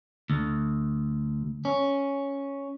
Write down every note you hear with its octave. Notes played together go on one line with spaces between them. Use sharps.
D2
C#4